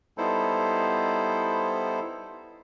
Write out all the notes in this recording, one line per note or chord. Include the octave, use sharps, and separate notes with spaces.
G3 B3 D#4 E4 A4 C5